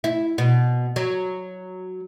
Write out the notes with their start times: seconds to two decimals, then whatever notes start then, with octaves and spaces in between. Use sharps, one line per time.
0.04 E4
0.38 B2
0.96 F#3